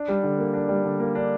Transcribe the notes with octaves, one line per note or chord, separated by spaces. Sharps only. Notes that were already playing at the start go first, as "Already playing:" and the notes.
Already playing: D4
G3
D3
A#3
D4
G3
D3
A#3
D4